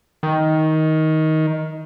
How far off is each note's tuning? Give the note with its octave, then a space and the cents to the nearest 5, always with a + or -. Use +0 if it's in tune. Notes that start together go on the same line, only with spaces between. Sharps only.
D#3 +15